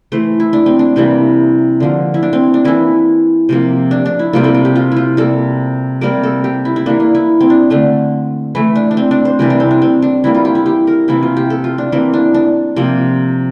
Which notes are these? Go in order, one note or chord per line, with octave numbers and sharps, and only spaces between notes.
E3 A3 C5
E4
D4
C4
D4
C3 E3 G3 A#3 C4
D3 F3 A#3
E4
D4
C4
D4
E3 A#3 E4
C3 F3 A#3
D4
D4
E4
C3 G3 A#3 F4
A4
G4
G4
F4
E4 F4
C3 G3 A#3 A4
C3 G3 A#3 A#4
A4
G4
E4
E4
E3 A#3 D4
D4
E4
C4
D4
D3 A3 D4
E3 A3 E4
D4
D4
C4
D4
C5
C3 E3 G3 A#4
D4
C4
D4
C4
D4
E3 G3 A#3 E4
F4
G4
E4
G4
A#4
C3 E3 A#3 E4
F4
G4
A4
F4
D4
E3 A#3 C4
D4
D4
C3 F3 A#3